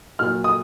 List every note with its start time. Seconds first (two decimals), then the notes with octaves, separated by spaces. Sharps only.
0.19 A#2 F#3 F6
0.44 D#6